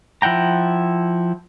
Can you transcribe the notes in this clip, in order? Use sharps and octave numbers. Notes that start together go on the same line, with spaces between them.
F3 E4 F#5 G5 A#5